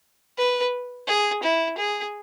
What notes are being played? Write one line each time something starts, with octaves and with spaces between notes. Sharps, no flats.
B4
G#4
E4
G#4